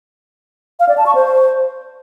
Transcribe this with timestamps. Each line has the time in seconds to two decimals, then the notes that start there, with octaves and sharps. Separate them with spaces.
0.80 F5
0.89 D5
0.97 A5
1.06 C#6
1.15 C5